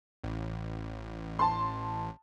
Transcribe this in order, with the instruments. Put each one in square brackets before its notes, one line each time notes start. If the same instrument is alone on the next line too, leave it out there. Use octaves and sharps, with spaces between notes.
[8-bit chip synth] A1
[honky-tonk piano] A5 C6